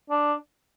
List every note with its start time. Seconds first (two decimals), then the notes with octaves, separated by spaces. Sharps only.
0.10 D4